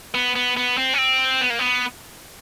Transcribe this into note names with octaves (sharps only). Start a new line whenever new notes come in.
B3
B3
B3
C4
C#4
C4
B3
A#3
B3